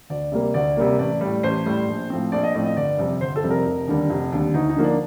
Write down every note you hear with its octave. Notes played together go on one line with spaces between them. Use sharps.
D2 D5
C3 G3 A#3
D2 D5
C3 G3 A#3
A1 D5
A2 G3
A1 C5
A2 G3
A#1
A2 F3 C4
A#1 D5
D#5
A2 F3 C4 D5
D#5
G1 D5
F2 C3 G3
G1 C5
A4
F2 C3 G3
A#4
F1
D#2 D3 G3
F1
D#2 D3 G3
D2 D#4
D#4
D3 F3 A#3
D4